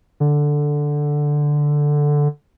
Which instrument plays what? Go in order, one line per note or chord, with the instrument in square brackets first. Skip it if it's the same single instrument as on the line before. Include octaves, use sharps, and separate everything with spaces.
[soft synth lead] D3